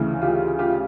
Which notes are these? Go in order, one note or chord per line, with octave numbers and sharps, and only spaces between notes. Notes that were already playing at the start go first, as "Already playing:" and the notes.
Already playing: D2 C#3 E3
F4 G4
F4 G4